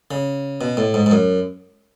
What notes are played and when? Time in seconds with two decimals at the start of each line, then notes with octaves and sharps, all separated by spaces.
0.11 C#3
0.61 B2
0.77 A2
0.94 G#2
1.06 G#2
1.11 F#2